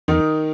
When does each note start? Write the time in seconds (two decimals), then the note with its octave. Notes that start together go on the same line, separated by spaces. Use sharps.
0.08 E2 D#3 D#4